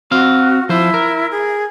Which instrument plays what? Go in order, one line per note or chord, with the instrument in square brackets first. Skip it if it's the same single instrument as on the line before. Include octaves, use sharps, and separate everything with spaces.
[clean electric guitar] C4 F5 [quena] F#4
[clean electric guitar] F3 C5 [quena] E4
[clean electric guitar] A#4
[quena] G#4